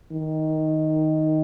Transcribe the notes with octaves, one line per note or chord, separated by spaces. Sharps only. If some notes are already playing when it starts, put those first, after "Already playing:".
D#3